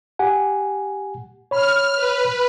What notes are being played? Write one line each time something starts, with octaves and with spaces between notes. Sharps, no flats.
G4 F#5 G#5
C#5 B5 F6
B4